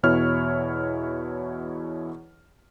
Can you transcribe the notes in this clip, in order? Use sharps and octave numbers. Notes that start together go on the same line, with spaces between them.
E2 B2 E4 C#5 F6